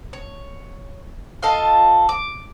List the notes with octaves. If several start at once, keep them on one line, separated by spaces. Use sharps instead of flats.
C#5
F4 A4 D#5 F5
D6